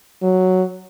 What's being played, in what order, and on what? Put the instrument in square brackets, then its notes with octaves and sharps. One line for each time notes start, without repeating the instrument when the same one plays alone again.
[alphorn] F#3